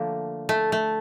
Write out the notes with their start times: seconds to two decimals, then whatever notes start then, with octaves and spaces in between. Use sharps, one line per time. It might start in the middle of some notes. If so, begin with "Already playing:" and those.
Already playing: D3 F3 A3 A#3
0.49 A3
0.72 A3